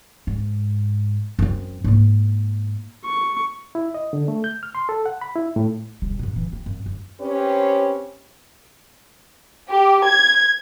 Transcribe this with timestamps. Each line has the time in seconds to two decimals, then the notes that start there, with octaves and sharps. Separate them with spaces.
0.27 G#2
1.39 F#2 C4
1.84 G#2 A#3
3.05 C#6
3.75 E4
3.94 D#5
4.13 D3
4.28 A3
4.44 G6
4.63 F6
4.75 C6
4.89 A4
5.06 F#5
5.21 B5
5.36 E4
5.56 A2
6.02 E1 G3
6.19 F#2 A#2
6.36 G2 E3
6.52 A#3 C4
6.66 F#2
6.86 F#2
7.21 C4 C#4 G4 B4 C#5
9.70 G4
10.04 G#6